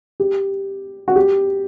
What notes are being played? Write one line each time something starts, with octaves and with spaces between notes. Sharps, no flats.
G4
F#4
G4